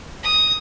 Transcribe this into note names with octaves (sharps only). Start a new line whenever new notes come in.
D#6